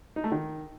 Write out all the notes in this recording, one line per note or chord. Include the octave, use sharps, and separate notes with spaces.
D#4
A3
D#3